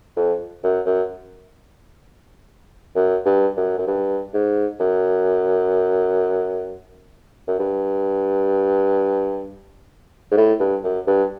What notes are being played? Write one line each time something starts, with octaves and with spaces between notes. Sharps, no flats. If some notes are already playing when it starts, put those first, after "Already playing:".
F2
F#2
F#2
F#2
G2
F#2
F#2
G2
G#2
F#2
F#2
G2
G#2
A2
G2
F#2
G2